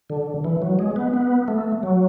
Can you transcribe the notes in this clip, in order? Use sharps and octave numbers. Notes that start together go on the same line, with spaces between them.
D3
E3
F#3
G#3
B3
B3
A3
F#3